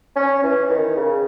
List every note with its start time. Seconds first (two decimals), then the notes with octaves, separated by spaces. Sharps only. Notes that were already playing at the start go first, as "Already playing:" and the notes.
0.16 C#4
0.43 E3
0.70 D#3
0.97 C#3